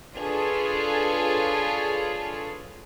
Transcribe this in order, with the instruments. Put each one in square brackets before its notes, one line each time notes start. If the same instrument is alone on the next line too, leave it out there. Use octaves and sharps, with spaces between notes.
[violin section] D4 F4 G#4 A4 B4 C#5